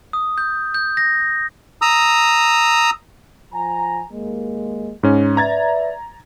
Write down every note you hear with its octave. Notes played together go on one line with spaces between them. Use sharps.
D#6
G6
G6
A#6
A#5 D#6 E6
F3 G#5 A#5
D#2 G#3 A#3
G#2 C#4
B4 D5 E5 A#5 G#6 A6